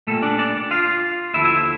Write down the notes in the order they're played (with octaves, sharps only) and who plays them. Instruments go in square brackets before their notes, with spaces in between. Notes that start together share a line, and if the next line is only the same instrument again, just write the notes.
[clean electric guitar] A#2 G3 A3 A#3 A4
D4 D5
D4 D5
F4 F5
D#2 D3 F3 A3 E4 E5
E4 E5